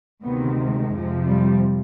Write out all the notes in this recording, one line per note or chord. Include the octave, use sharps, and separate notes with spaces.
D2 C3 D#3 B3
G#3
F2 C3 F3
G3